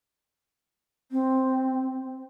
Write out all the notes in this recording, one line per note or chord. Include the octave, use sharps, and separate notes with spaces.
C4